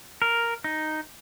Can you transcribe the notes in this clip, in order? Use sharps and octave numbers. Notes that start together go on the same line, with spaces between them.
A#4
D#4